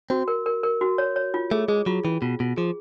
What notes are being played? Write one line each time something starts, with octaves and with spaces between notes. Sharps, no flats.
C4 F#4
A#4
A#4
A#4
F#4
C#5
C#5
F4
A3 G#4
G#3 G#4
F#3 F4
E3 C#4
B2 F4
B2 F4
F3 G#4